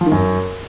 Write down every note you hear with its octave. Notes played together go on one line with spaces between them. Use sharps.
F3
D#3
F#2